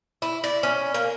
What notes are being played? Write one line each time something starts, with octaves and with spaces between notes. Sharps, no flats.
E4
D5
C#4
A#3